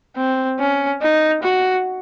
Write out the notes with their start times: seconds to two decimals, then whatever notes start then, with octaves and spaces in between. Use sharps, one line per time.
0.17 C4
0.59 C#4
1.01 D#4
1.43 F#4